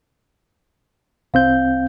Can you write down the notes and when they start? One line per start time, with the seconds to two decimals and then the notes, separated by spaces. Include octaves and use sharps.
1.34 C2 C4 F5 G6